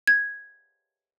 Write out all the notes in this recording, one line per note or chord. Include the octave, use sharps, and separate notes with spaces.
G#6